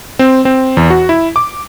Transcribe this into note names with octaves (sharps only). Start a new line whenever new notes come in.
C4
C4
E2
F#4
E4
D6